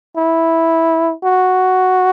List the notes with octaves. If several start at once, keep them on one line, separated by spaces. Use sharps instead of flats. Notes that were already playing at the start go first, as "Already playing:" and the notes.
E4
F#4